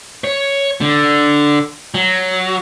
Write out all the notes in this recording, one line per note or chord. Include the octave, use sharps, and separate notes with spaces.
C#5
D3
F#3